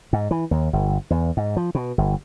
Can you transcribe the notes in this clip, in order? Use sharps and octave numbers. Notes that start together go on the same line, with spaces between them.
G#2
E3
D#2
G1
E2
G#2
F3
B2
G1